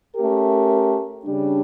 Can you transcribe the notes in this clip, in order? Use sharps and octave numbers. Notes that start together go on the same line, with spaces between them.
A3 C#4 G4 A#4
C#3 G3 D4